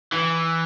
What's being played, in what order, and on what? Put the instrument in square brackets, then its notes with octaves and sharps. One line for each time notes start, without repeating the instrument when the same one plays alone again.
[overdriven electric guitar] E3